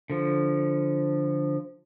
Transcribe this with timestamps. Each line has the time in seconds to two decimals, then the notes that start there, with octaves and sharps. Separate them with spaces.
0.10 D3 F3